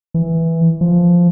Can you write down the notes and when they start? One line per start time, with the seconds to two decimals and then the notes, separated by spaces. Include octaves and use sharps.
0.14 E3
0.81 F3